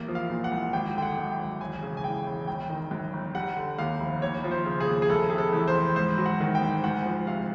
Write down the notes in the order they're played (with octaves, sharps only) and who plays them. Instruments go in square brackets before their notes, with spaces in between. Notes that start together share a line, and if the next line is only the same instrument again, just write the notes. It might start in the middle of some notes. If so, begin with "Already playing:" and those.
Already playing: [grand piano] A1 A#3
F3
F5
A#2
F#5
C2
G#1 G5
D3 G5
F#5
F#2
G5
G#1
E1 G#5
C#3
G#5
E2 G5
E1
G1 G5
D#3
F#2
G1
G3 F#5
D3
D#2 F5
F1
D#2 C#5
F3
C5
C#3
G#4
D#2
G#4
F1 A4
C3 G#4
A4
E2
C5
F1
G#2 C5
F#3
F#5
D#3
G5
G#2
D2 F#5
F3
C3 F5